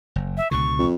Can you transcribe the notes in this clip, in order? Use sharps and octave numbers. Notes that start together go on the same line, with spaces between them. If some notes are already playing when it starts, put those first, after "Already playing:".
F#1
E5
C#2 B2 D3 C#6
F2